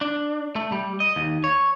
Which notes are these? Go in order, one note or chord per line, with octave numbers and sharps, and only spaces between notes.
D4
A3
G3
D#5
D#2
C#5